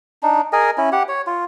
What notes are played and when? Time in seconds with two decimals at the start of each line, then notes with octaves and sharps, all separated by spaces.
0.23 D4 D#4
0.53 G#4 A#4 D#5 G#5
0.78 C#4 E4
0.92 G4 F#5
1.09 C#5
1.27 F4